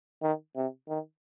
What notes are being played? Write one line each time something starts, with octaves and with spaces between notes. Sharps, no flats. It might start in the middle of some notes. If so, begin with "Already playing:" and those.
D#3
C3
D#3